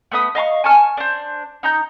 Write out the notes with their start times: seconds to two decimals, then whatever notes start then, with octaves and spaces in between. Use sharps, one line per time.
0.12 A3 B3 B5 D#6
0.35 D#5 F5 A#5 C#6
0.64 G#5 A5 C#6 F6
0.97 D4 C5
1.63 D#4 A#5 G6